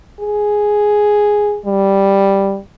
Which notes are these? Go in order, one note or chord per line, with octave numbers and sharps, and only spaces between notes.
G#4
G3